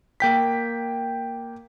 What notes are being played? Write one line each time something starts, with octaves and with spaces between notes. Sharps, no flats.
A#3 G5 B6